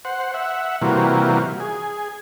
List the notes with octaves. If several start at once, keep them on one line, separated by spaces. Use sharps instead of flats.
C5 F#5
E5 F#5
C3 E3 G3 A#3 F4 F#4
G#4